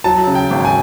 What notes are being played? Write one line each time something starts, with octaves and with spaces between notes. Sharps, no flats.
F#3 A5
C#3
G5
G#1
G#5